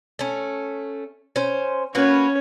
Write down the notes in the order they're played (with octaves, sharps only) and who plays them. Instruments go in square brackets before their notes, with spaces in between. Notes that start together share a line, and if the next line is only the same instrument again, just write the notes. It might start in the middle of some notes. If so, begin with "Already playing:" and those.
[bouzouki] A3 C#4
C#4 C5
[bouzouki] A#3 F#4 B4 [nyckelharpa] C#4 C#5